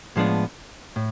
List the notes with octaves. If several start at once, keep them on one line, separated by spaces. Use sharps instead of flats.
A2 F3 G#3 B3 D4
A2